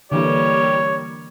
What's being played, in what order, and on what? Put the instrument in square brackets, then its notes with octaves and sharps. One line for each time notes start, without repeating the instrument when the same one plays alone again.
[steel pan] D3 E3 [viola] G3 A#3 [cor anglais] G4 [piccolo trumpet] C#5